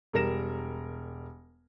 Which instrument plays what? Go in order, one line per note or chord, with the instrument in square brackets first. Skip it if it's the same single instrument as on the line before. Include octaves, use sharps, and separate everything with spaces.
[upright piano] E1 G3 A#4 A#6 E7